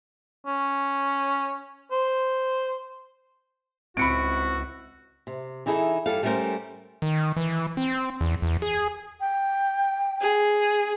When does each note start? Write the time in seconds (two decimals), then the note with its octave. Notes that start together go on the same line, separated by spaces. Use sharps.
0.46 C#4
1.91 C5
3.97 C#2 C4 E4 F#4 B5 C#7 D7
5.27 C3
5.66 E3 D#4 E4 G#4 A4
6.06 G2 G3 A4 F5
6.23 G3 A3 C#4 F4 A#4 C5
7.02 D#3
7.37 E3
7.77 C4
8.21 E2
8.42 E2
8.62 G#4
9.21 G5
10.21 G#4